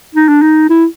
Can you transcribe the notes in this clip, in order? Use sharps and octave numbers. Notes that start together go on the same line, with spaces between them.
D#4
D4
D#4
E4